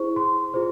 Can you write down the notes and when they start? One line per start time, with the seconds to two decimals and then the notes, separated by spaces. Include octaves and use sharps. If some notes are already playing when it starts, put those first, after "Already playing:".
Already playing: E4 G#4 C5 C#6
0.16 C6
0.54 F4 G#4 C5